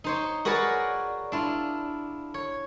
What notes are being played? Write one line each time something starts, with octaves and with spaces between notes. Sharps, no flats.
D#4 C5 C#5
F#4 G#4 A#4 B4 C#5 D5
D4 E4 F4
C#5